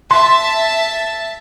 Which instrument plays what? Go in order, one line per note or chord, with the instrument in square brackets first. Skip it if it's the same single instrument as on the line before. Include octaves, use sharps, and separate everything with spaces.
[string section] E5 A5 [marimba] C6